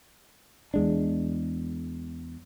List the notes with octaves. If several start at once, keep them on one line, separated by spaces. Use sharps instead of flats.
E2 G#3 D4